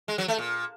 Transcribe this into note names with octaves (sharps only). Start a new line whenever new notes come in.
G#3
F#3
A3
A#2